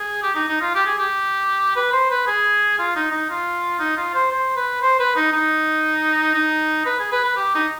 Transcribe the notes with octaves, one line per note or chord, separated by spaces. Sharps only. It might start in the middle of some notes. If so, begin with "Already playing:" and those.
Already playing: G#4
G4
D#4
D#4
F4
G4
G#4
G4
B4
C5
B4
G#4
F4
D#4
D#4
F4
D#4
F4
C5
C5
B4
C5
B4
D#4
D#4
D#4
B4
G#4
B4
B4
G4
D#4